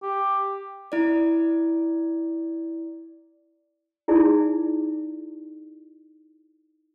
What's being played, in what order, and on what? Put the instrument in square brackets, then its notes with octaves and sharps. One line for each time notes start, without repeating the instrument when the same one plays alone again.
[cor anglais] G4
[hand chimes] E4 D5
[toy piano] D#4 E4 G#4 D5